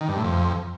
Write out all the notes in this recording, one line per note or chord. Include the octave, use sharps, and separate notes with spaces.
D#3
G2
A2
F2